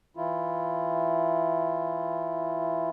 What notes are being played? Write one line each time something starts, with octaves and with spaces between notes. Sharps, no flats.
E3 E4 F4